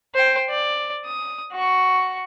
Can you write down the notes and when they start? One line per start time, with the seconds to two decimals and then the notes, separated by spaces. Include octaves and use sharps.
0.15 C5 G5
0.50 D5
1.06 D#6
1.52 F#4 C#6